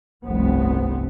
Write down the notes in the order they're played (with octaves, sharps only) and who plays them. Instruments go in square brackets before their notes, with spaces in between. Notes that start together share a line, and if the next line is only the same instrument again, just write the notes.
[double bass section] F1 C2 G2 B3 C4